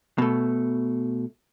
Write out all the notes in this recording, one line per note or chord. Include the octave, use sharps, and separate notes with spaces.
B2 A3